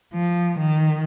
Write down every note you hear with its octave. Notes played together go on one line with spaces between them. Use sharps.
F3
D#3